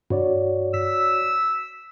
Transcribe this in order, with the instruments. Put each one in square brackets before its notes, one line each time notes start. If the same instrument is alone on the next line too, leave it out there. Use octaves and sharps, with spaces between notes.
[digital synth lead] G2 [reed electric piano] F#4 C#5 D5
[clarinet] E6 [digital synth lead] B6